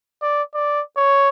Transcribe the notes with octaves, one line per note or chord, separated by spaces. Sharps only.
D5
D5
C#5